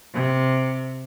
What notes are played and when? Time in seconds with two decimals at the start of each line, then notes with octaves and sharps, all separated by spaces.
0.13 C3